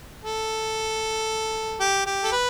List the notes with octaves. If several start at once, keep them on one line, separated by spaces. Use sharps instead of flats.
A4
G4
G4
A4
B4